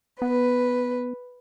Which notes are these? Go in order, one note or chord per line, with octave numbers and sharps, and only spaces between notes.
B3 B4